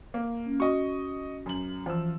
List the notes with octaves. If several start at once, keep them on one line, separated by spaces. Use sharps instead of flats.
A#3
C#4
F#4 D#5 C#6
F#2 F#7
E3 F3 E6